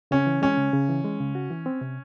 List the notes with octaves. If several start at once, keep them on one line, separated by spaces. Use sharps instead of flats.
C#3 C#4
E3
G#3 C#4
C#3
C#3
E3
G#3
C#3
F#4
E3
C4
C3